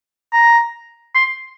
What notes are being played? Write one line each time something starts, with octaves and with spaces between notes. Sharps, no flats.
A#5
C6